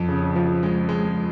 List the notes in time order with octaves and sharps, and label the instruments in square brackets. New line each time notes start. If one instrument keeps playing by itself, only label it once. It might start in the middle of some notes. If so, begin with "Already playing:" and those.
Already playing: [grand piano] F2
C#3
F3
G#3
G#3